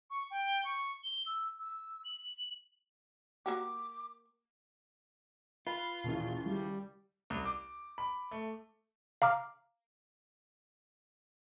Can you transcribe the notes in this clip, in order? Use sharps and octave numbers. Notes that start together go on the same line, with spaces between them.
C#6
G5
C#6
G7
E6
E6
F#7
A#3 F#4 G4 D6
F4 B4
D#2 A#2 C#3 E3
G3
C2
D6
B5
A3
F5 A#5 D6 F6